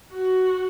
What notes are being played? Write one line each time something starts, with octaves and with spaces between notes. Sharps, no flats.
F#4